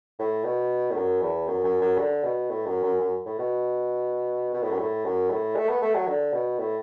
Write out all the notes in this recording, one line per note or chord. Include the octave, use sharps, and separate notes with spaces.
A2
B2
A2
F#2
E2
F#2
F#2
F#2
D3
B2
A2
F#2
F#2
F#2
A2
B2
B2
A2
F#2
A2
F#2
A2
A3
B3
A3
F#3
D3
B2
A2